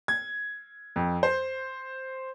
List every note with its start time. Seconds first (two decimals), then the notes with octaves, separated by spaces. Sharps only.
0.08 G#6
0.96 F2
1.23 C5